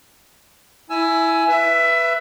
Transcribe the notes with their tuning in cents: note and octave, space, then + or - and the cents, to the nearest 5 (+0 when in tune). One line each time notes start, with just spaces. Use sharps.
E4 +0 G#5 +15 E6 +20
B4 +0 E5 +20 E6 +0